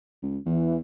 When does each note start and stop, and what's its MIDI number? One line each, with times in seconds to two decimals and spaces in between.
0.22 0.38 37
0.46 0.80 40
0.46 0.77 52